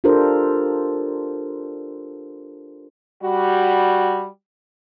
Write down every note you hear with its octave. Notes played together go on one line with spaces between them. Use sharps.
D4 F4 G4 A4 A#4 C5
G3 F#4